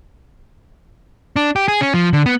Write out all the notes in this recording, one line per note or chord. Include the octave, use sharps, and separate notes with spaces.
D4
G4
G#4
C#4
F3
D3
B3